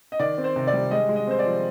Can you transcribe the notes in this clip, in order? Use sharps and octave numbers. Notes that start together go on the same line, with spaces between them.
D#5
D#3 D5
C4
C5
C3
D5
G3
G#3 D#5
G#3
D#5
C4 C5
D5
F3